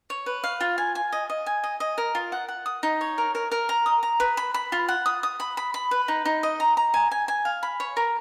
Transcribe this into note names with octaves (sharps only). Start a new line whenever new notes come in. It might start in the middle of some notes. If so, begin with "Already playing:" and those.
C#5
B4
F5
F4
G#5
G#5
D#5
D#5
G#5
D#5
D#5
A#4
F4
F#5
F#5
D#6
D#4
C#5
A#4
A#4
A#4
A#5
D#6
A#5
B4
B5
B5
F4
F#5
D#6
D#6
B5
B5
B5
B4
D#4
D#4
D#5
A#5
A#5
G#5
G#5
G#5
F5
B5
C#5
A#4